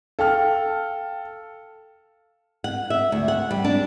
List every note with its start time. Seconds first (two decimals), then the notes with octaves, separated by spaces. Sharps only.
0.19 A4 F5 G5 A5 F6
2.64 F#5
2.90 E5
3.12 D2
3.28 F#5
3.51 G3
3.65 D4